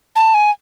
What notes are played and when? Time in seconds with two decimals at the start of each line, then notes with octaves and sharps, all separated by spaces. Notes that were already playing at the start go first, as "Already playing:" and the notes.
0.16 A5
0.34 G#5